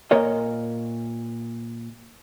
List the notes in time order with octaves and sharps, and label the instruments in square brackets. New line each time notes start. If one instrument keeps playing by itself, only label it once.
[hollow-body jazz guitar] A#2 A#4 C#5 D#5